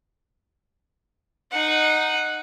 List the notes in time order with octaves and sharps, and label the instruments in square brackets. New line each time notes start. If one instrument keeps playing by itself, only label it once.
[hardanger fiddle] D#4 F#5